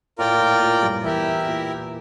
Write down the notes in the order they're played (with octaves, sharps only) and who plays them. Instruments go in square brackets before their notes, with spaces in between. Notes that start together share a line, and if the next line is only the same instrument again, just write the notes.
[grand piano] A2 [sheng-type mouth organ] F4 A#4 D5 G5
[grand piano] A#2
A2
A#2
G2 G3
[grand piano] E2 E3 [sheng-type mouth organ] E4 G4 A#4 E5
[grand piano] A#2